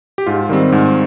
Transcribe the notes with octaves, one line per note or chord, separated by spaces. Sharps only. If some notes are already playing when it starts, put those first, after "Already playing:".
G4
G#2 F4
D#3 G3 C4
G#2